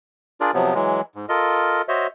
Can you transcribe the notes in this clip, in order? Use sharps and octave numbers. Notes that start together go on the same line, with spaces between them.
D4 F4 G#4 A#4 D5
C3 F3 F#3 B3
E3 F#3 G#3
G#2
F4 A4 A#4 D#5
F#4 C5 C#5 D#5 E5